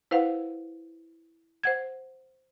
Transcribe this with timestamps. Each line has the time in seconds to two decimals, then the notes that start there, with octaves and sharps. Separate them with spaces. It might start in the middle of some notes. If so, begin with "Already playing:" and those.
0.11 E4 B4 C5 F5 F#5
1.63 C5 F#5 G#6